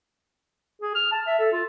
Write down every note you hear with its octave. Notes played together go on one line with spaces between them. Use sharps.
G#4
F6
A5
E5
A4
F4